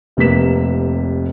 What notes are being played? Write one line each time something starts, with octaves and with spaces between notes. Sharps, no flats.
F1 C3 A#3 B4 B6 E7